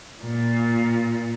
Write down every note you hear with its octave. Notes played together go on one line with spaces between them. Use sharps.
A#2